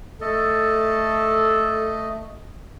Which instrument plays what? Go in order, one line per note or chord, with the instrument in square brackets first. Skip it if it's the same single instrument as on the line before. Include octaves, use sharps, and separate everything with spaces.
[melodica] A3 D#5 [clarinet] A4